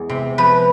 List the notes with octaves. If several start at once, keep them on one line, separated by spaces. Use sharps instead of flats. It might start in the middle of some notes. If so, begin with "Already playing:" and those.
Already playing: E2 G#3
C3
F3 B4